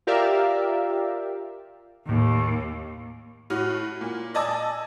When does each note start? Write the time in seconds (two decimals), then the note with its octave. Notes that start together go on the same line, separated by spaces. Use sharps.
0.07 F4 G4 A#4 D5 E5 F5
2.09 D#2 A2
3.50 A2 F#4 F6
4.01 A#2
4.34 D5 D#5 G#5 A5 D6 E6